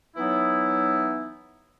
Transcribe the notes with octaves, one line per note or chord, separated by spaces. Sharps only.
E3 F#3 B3 D#4 E4